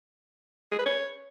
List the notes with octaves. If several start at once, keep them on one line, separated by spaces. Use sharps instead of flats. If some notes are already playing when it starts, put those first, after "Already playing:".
G#4
B4
C#5